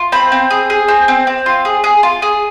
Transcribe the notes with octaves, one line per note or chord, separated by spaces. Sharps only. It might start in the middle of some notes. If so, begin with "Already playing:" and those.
Already playing: F4
C4 B5
C4
G#4
G#4
C4
C4
C4
F4
G#4
G#4
F4
G#4